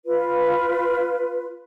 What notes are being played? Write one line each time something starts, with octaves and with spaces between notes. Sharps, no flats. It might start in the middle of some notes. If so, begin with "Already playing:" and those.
F4 B4